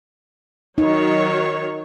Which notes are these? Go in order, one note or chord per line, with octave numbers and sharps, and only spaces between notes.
D#3 F#3 D#4 C#5